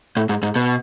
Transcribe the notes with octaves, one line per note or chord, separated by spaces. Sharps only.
A2
G#2
G#2
B2